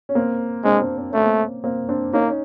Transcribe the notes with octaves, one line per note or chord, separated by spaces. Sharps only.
C#4
A#3 C4
G#3 C4 D4
C4 D4
C4
A3 C#4
A#3 C4
A#3 C4
C4 D4
A#3 C#4 D#4
C#4